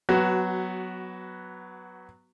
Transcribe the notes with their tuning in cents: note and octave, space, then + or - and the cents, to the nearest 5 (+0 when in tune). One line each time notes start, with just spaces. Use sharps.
F#3 +0 B3 +0 F#4 +20